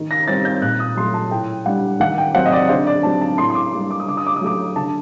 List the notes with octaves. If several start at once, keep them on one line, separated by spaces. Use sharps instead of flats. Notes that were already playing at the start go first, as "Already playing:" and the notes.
Already playing: D#3
A#6
G3 C4 D#4 A6
G6
A#2 F#6
D#6
F#3 A3 C6
A5
A2 G5
G3 D4 F#5
D#3 F#5
G5
F#3 C4 F#5
D#5
D5
D3 C5
D5
F#3 C4 D#4 A5
A5
A2 C6
C6
D6
G3 A#3 D4
D6
D#6
D3 D6
D#6
D6
D#6
F#3 A3 D6
D3 A5